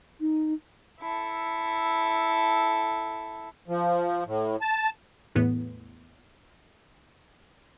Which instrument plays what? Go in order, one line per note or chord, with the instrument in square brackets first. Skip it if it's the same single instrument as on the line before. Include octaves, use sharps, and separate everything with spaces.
[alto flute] D#4
[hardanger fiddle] E4 A4
[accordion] F3
A2
A5
[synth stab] E2 A2 B3